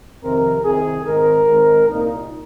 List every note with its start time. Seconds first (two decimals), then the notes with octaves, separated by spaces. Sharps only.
0.21 F2 C3 D#3 C4 A#4
0.63 C2 C3 D#3 G#4
1.04 G#2 D#3 C4 A#4
1.46 G#2 D#3 G#3 C4
1.88 C2 A#2 A#3 D#4